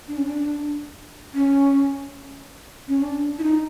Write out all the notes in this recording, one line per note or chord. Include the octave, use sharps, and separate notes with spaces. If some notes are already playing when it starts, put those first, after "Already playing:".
D4
C#4
D4
C#4
C#4
D4
E4
D#4